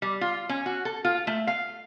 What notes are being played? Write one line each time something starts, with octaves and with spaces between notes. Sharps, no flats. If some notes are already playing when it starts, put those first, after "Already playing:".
G3
F4
C#4
F#4
A4
F4
A3
F5